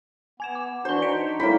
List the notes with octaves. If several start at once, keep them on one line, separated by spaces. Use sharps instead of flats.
B3 G#5 G#6 E7
D6
E3 D4 F#4 C5 G6 G7
D#4 B6 C#7 D7
G3 A3 A#3 D#4 E4 C#5 B5